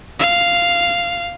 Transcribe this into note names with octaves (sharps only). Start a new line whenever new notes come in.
F5